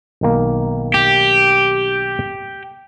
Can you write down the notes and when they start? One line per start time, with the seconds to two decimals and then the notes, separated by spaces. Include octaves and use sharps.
0.21 B1 D#3 A#3
0.94 G4